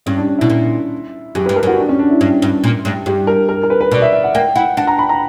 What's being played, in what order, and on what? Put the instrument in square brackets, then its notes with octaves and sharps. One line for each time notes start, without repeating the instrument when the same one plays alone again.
[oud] G2 [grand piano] C#4
[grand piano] D4
D4
[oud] B2 [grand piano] E4
[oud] A#2
[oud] F#2 [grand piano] G4
[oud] G2 [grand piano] B4
[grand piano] A#4
[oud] F#2 [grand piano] F#4
[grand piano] D4
C#4
D4
E4
[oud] G2
G2
A#2
G2
[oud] G2 [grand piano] G4
[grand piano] A#4
A#4
A#4
B4
B4
[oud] B2 [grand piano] D5
[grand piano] E5
E5
F#5
[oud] A#3 [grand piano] G5
[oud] E4 [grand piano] F#5
[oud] D4 [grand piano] F#5
[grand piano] A#5
B5
A#5